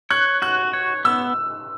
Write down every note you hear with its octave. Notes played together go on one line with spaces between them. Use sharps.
C#5 F#6
F#4 F#6
C#5
B3 E6